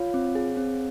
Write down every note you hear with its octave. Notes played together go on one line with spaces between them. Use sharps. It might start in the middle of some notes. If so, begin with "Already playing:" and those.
Already playing: F4 C#5 F5
C4
G#4
C4